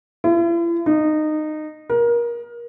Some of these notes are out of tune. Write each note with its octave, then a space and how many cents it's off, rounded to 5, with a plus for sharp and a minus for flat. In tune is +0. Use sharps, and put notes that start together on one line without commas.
E4 +45
D#4 -20
A#4 +25